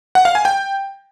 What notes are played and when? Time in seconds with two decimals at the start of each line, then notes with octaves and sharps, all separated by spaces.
0.15 F#5
0.25 F5
0.35 G#5
0.45 G5